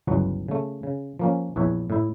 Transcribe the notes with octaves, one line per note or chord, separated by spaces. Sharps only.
G1 C#2 E3 F#3 B3 F#4
C#3 A3
C#3
F3 A#3 C#4
A#1 E2 E4 B4 C#5
A2 E4